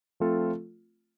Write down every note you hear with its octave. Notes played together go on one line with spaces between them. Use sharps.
F3 A3 C4 F4 A4